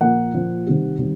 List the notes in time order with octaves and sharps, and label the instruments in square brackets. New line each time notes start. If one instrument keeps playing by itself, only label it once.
[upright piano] A#2 F3 A#3 F#5
A#2 F3 A#3
C3 D#3 G3
C3 D#3 G3